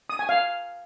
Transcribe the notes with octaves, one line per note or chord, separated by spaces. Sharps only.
D#6
G#5
F5